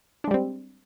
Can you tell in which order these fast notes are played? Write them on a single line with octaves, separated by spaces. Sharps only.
D4 G#3 G3 C4